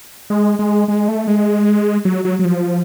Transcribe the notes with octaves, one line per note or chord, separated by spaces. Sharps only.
G#3
G#3
G#3
A3
G#3
F#3
F#3
F#3
F3